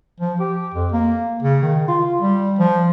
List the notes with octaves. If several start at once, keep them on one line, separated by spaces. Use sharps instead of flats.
F3
G4
F2
A#3
C#3
D#3
F4
G3
F3